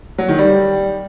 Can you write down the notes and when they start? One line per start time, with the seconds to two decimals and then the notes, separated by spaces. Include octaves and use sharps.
0.18 F#3
0.28 D#3
0.38 G3